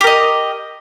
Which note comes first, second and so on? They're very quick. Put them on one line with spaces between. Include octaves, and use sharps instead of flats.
G4 A#4 D#5